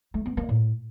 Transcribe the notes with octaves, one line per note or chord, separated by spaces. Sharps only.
A3
B3
A#3
A2